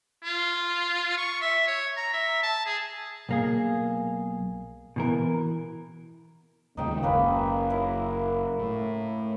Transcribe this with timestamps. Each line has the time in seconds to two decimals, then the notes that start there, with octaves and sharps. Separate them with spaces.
0.24 F4
1.18 C#6
1.42 E5
1.68 C#5
1.97 A#5
2.13 E5
2.43 A5
2.66 G#4
3.29 B1 A#3 G#4
4.96 B2 E3 A#4
6.77 D#2 C#3 G#3 D#4 G5
7.03 F#1 A#3 C#4 B4
7.70 E4 A#4 F#5
8.59 A2